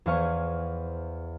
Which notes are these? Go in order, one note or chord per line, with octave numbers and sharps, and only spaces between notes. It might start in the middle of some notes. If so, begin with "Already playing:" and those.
E2 C5 F5 G#5 C#6